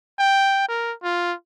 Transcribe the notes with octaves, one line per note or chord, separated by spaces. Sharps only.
G5
A#4
F4